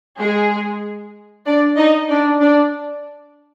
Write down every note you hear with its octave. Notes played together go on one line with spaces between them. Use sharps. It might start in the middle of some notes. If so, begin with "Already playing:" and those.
G#3 G#4
D4 D5
D#4 D#5
D4 D5
D4 D5